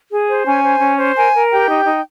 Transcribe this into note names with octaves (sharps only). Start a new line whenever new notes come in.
G#4
C5
C#4 G#5
C5
C#4
C5
A#4 G#5
A#4
G4 G5
D#4
D#4